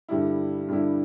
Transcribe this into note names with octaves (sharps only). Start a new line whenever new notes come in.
G2 D3 G3 E4
G2 D3 G3 E4